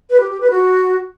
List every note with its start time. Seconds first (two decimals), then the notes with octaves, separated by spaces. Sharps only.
0.10 B4
0.20 G4
0.30 G4
0.40 B4
0.51 F#4